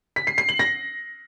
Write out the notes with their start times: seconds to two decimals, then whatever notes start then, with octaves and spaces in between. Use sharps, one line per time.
0.16 B6
0.27 C7
0.38 C7
0.49 F#7
0.59 A#6